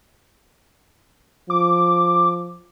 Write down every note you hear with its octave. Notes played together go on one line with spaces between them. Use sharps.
F3 D6